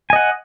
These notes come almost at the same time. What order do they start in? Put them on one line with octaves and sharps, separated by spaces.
G#5 D#5 F#5